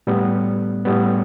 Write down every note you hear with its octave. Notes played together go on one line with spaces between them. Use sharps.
A2 G3 B3
A2 G3 B3